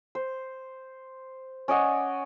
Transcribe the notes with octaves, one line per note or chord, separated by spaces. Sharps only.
C5
C#4 D5 D#5 F#5